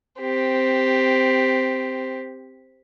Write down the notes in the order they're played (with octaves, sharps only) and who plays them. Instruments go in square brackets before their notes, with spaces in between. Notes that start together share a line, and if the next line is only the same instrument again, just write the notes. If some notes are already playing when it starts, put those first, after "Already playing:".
[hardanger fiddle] C4 G4